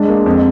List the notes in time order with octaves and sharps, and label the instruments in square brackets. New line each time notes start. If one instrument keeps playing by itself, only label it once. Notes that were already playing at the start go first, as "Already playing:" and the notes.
Already playing: [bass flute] G#3 [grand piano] D4
[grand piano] A#3
F2